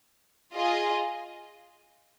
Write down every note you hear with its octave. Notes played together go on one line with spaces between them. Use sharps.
F4 G#4 D#5